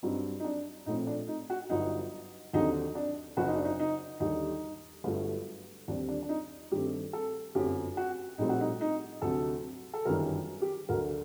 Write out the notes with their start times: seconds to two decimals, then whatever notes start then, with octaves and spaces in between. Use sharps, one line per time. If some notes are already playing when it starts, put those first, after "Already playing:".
0.03 G2 F#3 C4 D#4
0.40 D#4
0.44 D4
0.86 A#1 A2 A3 C4 D#4
1.07 D4
1.28 D#4
1.50 F#4
1.70 G1 G2 F#3 D#4
2.53 D#2 D3 F#3 C4 D#4
2.95 D4
3.37 F#1 F#2 F#3 F#4
3.47 D#4
3.56 D4
3.65 D#4
3.79 D#4
4.20 D#2 D3 G3 D#4
5.04 G1 G2 F#3 A3
5.88 D#2 D3 G3 C4 D4
6.08 D4
6.22 D4
6.29 D#4
6.72 G2 D#3 A3 C4 G4
7.13 A4
7.55 G1 F#2 F#3 A3 C4 G4
7.97 F#4
8.38 A#1 A2 G3 C4 D#4
8.49 F#4
8.61 D#4
8.81 D#4
9.22 D2 C3 F#3 A4
9.94 A4
10.05 G1 F#2 D#3 G3 A#4
10.62 G4
10.89 D2 D3 F#3 A#4